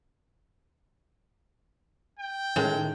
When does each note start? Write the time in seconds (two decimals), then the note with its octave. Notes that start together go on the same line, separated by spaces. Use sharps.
2.19 G5
2.56 A2 D#3 G#3 C#4 G#4 A#4